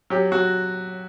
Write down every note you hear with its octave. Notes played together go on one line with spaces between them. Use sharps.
F#3 G4
F#3 F#4